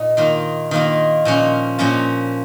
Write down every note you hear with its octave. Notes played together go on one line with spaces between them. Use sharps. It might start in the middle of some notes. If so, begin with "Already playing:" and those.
Already playing: A#2 D#4
D#3 A#3 F4
D#3 A#3 F4
A#2 F3 C#4 F4
A#2 F3 C#4 F4